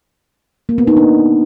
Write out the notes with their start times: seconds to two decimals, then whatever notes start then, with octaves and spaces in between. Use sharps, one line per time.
0.69 A#3
0.78 B3
0.87 D#4
0.97 D4